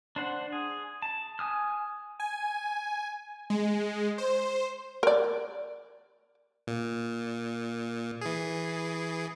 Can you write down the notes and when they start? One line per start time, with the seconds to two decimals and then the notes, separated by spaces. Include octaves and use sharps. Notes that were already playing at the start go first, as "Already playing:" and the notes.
0.16 D4 C5 F#5
0.52 G#4
1.02 A5
1.39 G#5 D#6 F6
2.20 G#5
3.50 G#3
4.18 C5
5.03 A#4 D5
6.67 A#2
8.21 E3 G#4